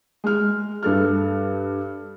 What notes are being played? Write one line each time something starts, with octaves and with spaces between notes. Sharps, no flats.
G#3 F6
G2 A4 F6